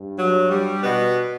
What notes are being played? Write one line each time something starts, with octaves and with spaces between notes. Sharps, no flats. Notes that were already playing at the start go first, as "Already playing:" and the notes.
Already playing: G2
F#3
G3
B2 B3